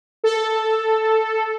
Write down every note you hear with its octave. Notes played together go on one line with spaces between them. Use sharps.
A4